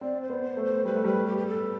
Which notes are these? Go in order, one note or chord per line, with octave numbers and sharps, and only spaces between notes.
C4 D5
C5
B3
C5
A3
C5
G3 B4
A3
G3 B4
G4
G4
A4